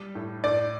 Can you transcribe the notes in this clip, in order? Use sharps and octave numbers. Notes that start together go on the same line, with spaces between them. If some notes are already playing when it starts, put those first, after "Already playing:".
Already playing: G3
A2
A2 D5